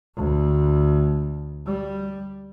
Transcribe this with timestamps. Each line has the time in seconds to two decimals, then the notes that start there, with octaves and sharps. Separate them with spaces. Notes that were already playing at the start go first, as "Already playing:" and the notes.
0.16 D2
1.67 G3